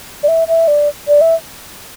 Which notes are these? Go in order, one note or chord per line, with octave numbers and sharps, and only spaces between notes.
D5
E5
E5
D5
D5
E5